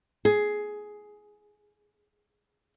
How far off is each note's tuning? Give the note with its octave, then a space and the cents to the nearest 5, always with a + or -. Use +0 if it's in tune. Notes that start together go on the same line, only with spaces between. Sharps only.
G#4 +10